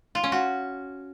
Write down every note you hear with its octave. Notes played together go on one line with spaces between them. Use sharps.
F4
C#4
F#4